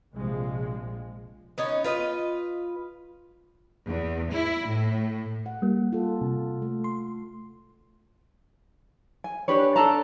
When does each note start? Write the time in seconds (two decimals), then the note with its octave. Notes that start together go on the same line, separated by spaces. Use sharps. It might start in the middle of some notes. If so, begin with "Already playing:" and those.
0.15 A#1 C3 F3 G#3
1.58 B3 C#4 D#4
1.84 F4 B4 D#5
3.87 E2
4.32 E4
4.68 A2
5.46 F#5
5.62 G3 A#3
5.92 F4 A4
6.21 C3
6.62 A3
6.84 C6
9.24 G#5
9.48 D4 G4 B4 C#5
9.76 D4 A4 A5 A#5